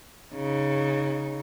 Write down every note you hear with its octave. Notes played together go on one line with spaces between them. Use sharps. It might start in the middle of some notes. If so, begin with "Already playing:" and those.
C#3 D#4